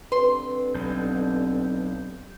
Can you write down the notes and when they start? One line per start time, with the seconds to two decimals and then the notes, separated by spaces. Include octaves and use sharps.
0.12 G2 D3 C4 B4 C6
0.74 B1 G6